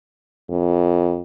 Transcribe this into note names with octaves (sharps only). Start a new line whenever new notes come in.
F2